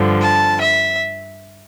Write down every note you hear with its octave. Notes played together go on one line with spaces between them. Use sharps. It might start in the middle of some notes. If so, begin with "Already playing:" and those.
Already playing: G2 D3 F3
A5
E5